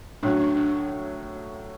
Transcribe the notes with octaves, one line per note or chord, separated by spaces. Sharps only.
A2 F#3 C#4 D4 F#4
D4
D4